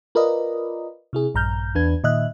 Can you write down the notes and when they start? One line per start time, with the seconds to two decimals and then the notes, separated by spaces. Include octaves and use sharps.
0.15 F4 A#4 B4 D5 D#5
1.13 C3 E4 G#4
1.34 A#1 G2 A#5 F6 G6
1.75 E2 D4 B4 G#6
2.04 A#2 D#3 D#5 E5 F#6